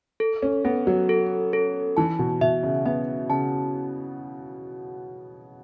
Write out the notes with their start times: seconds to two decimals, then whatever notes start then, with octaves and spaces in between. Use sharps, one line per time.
0.20 A4
0.42 C#4
0.65 B3 A4
0.87 F#3
1.09 A4
1.53 A4
1.97 E3 A5
2.19 B2
2.41 B2 E5
2.63 C#3
2.85 B3 E5
3.30 C#3 A5